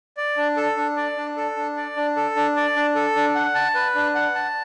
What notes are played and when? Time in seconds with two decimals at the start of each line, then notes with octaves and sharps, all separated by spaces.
0.17 D5
0.37 D4
0.57 A4
0.77 D4
0.96 D5
1.17 D4
1.37 A4
1.56 D4
1.76 D5
1.96 D4
2.16 A4
2.36 D4
2.56 D5
2.76 D4
2.95 A4
3.15 D4
3.35 F#5
3.55 A5
3.75 B4
3.95 D4
4.15 F#5
4.35 A5